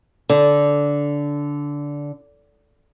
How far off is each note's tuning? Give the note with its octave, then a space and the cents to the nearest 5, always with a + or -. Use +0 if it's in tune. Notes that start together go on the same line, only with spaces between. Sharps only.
D3 -15